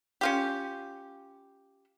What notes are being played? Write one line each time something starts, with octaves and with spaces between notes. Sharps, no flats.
C#4 F4 G4